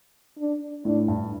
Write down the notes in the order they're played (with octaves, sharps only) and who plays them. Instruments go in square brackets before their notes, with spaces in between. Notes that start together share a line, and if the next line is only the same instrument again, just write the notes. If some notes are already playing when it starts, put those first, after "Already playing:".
[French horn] D4
[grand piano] A2 [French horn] D4
[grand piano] G2